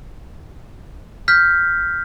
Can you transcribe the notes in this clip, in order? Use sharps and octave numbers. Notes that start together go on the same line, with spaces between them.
F6 G6 B6